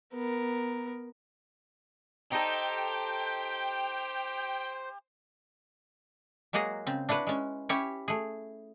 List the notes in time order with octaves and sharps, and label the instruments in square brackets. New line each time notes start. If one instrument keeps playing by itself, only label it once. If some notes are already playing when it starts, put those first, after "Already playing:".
[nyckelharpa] B3 A#4
[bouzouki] D#4 A4 [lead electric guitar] G4 [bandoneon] C5 [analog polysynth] G5
[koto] F#3 G#3 A#3 F#4 G#4 A#5
C#3 C4
D4 E4 F#4 B4
G#3 C#4
C#4 E4 G4 C#5
A3 G#4